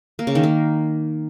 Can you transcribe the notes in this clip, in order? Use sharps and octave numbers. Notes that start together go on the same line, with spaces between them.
A#3
C#3
D#3
A#3